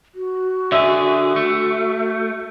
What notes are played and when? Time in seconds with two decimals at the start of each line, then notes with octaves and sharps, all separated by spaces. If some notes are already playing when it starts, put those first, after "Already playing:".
0.15 F#4
0.72 D3 G#4 E5
1.36 A3